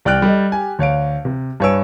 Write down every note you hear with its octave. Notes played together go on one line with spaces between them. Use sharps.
C2 D5 G5 F6 F#6 D7
G3 A4 D#5
G4 G#5
D2 C#5 F5 D7
C3
G2 B4 C#5 G#5 E6 D7